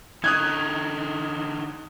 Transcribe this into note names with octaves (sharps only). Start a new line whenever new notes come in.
D3 D#4 D#6 F#6 G#6